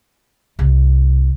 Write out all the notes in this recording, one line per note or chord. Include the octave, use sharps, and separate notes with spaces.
C2